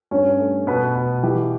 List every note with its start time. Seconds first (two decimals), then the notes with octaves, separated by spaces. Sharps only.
0.11 G2 C#4 C#5
0.39 A3
0.67 B2 B3 B4
0.95 B2
1.23 E3 G4